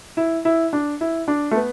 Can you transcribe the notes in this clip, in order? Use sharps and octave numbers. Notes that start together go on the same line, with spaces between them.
E4
E4
D4
E4
D4
A3
B3